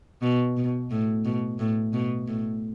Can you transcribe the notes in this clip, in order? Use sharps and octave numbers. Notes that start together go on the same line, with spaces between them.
B2
B2
A2
B2
A2
B2
A2